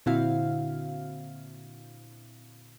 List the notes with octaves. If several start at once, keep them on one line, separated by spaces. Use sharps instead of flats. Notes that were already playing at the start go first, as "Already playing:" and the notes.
A#2 D3 C4 E4 F#4 F5